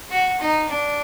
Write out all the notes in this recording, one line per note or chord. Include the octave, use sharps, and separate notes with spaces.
F#4
D#4
D4